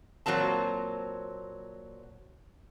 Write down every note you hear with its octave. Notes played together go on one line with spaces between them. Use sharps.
A#2 F#3 A#3 C4 A5